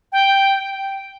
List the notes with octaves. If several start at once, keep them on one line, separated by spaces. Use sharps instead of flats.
G5